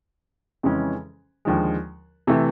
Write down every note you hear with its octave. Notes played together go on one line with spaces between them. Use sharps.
F2 C#3 E3 G#3 C#4
D#2 D3 F3 G#3
C3 E3 A3